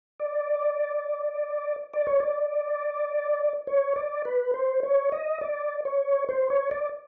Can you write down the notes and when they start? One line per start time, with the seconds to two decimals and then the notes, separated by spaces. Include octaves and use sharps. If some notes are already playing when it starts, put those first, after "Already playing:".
0.20 D5
1.94 D5
2.07 C#5
2.20 D5
3.67 C#5
3.96 D5
4.25 B4
4.54 C5
4.83 C#5
5.12 D#5
5.41 D5
5.85 C#5
6.29 C5
6.50 C#5
6.71 D5